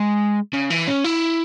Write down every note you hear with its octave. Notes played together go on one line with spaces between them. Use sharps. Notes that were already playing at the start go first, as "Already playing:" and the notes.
Already playing: G#3
C#3
E3
C#4
E4